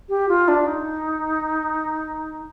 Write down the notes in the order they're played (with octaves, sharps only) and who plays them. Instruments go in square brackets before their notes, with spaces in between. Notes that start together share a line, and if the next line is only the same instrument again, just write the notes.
[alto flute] G4
F4
D4
D#4